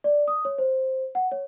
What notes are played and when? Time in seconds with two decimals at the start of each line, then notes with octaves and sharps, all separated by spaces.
0.04 D5
0.28 D#6
0.45 C#5
0.58 C5
1.15 F#5
1.32 C#5